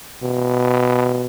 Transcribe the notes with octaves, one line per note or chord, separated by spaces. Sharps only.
B2